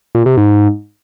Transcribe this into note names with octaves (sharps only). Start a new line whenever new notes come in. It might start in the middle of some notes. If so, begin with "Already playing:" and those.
A#2
C3
G#2